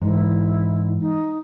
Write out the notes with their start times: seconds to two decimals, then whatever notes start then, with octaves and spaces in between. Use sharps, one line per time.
0.02 G#2 E3 G#3 E4
1.00 D#4